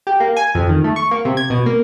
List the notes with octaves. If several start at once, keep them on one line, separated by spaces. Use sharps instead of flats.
G4
A#3
G#5
F2
D#3
A3
C#6
A#3
C3
G#6
B2
A#3